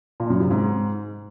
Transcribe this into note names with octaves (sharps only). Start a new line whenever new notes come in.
A#2
F#2
C3
G#2